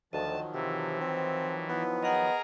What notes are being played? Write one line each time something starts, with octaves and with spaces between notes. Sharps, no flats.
D2 D#3 F3 F#3 D#5 A5
C3 E3 E6
C4
B3 E4
G#4 A#4 D#5 F#5 A#5